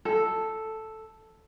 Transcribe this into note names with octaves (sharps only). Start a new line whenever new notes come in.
A4